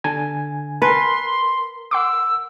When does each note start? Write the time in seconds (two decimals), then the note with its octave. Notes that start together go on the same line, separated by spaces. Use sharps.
0.04 D3 G#5 A5
0.82 A#4 B4 G#5 A5 C6
1.91 F#5 C6 D6 E6